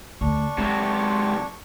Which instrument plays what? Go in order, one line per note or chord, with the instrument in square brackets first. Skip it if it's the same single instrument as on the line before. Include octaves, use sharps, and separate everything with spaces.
[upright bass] D2 [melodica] D4 C#6
[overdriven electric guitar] C3 F#3 [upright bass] G#3